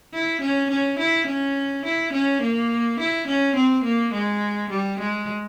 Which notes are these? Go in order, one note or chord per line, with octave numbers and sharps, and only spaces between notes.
E4
C#4
C#4
E4
C#4
E4
C#4
A#3
E4
C#4
C4
A#3
G#3
G3
G#3